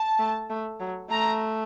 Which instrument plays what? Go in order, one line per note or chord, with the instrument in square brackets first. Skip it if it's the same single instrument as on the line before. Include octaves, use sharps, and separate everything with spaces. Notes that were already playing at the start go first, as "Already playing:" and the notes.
Already playing: [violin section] A5
[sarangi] A3
A3
F#3
[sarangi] A3 [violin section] A#5